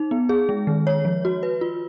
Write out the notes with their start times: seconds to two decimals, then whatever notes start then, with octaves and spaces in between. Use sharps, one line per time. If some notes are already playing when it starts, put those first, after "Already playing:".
Already playing: D#4
0.11 B3
0.29 G#4
0.49 G#3
0.67 D#3
0.87 C#5
1.05 F3
1.25 F#4
1.43 B4
1.61 F4